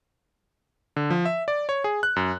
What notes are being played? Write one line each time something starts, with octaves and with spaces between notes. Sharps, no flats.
D3
F3
E5
D5
C#5
G#4
F#6
F#2